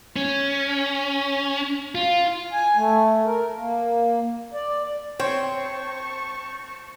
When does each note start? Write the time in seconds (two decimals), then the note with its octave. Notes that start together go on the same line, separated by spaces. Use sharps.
0.16 C#4
1.95 F4
2.53 G#5
2.77 A3
3.26 A#4
3.56 A#3
4.54 D5
5.20 C4 C#5 G5 A5 C#6